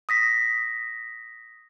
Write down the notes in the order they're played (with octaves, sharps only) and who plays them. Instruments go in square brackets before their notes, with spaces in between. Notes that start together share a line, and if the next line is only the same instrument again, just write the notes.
[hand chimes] D#6 A#6 B6